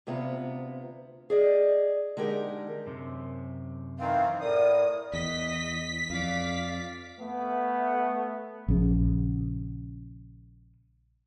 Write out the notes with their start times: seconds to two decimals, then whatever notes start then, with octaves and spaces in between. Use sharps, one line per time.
0.07 D2 C3 B3 F4 A#5
1.30 G#4 D5 D#5
2.17 D3 G#3 D#4 G4 A#4
2.86 F#2 C3
3.99 D#3 E3 C4 F5
4.41 A2 A#4 D5 D#6
5.13 E2 D#5 B6
6.10 F2 D5 F5
7.19 A3 B3
8.68 A#1 C#3